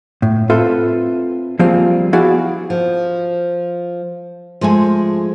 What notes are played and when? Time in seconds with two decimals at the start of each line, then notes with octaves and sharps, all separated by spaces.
0.22 A2
0.50 C4 F4 A4 B4 E5
1.59 F3 G3 A#3 C4 G#4 F5
2.13 B3 E4 F#4 G#4 D5 F5
2.70 F3
4.61 F3 G#3 A3 G#5